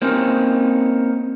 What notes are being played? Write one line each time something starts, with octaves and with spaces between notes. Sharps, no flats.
A#3 C4 C#4 D#4